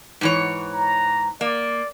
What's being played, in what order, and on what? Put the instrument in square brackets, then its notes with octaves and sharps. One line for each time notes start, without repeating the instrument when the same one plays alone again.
[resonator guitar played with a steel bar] G#2 E3 C#5
[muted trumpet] A#5
[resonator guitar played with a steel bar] A#3 [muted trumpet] D5